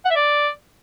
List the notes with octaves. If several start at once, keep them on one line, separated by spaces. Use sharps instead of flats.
F#5
E5
D5